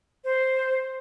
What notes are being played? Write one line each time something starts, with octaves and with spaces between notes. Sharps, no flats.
C5